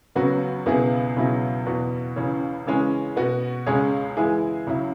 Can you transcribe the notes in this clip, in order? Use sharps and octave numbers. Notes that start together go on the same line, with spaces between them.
C#2 C#3 F#3 B3 F#4
C#2 B2 B3 E4 G#4
C#2 B2 F#3 E4 G#4
E2 B2 B3 F#4
C#2 C#3 E3 C#4
C#3 E3 G#3 C#4 G#4
B2 B3 F#4
C#2 C#3 G#3 C#4 G#4
E3 G#3 E4 G#4
C#2 C#3 F#3 E4